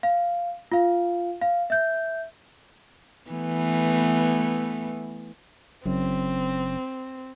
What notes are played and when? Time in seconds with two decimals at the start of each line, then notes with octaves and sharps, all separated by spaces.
0.03 F5
0.72 F4 F5
1.42 F5
1.70 E5 G6
3.31 E3 A3 B3
5.85 F#1 F#2 C4